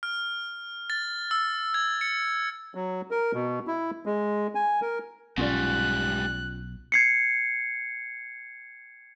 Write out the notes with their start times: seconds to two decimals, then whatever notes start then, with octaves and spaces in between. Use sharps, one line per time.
0.03 F6
0.90 A6
1.31 E6
1.74 G#6
2.01 C#7
2.75 F#3
3.11 A#4
3.34 B2
3.67 E4
4.06 G#3
4.55 G#5
4.82 A#4
5.38 B1 G#2 G3 C#4 F4 D5 F#6
6.92 G#6 C7 C#7